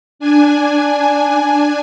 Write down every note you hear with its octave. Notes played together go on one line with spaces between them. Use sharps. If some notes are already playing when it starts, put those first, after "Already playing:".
D4 G#5